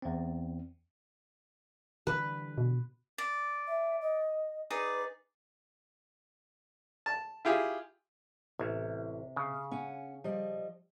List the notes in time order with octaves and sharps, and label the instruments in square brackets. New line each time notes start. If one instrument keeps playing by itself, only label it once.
[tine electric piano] E2 C4
[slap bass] D3 E3 G3 [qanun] B4
[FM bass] B2
[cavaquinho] D5
[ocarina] E5
D#5
[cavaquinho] D#4 G#4 D5 [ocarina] B4
[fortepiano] A5
E4 F4 G4 G#4
[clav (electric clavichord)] A1 [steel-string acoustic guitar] C3
[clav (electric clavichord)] C#3
[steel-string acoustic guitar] C#4 F#5 G#5
F3 G3 D#5